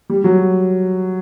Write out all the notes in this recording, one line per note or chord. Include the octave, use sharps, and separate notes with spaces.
G3
F#3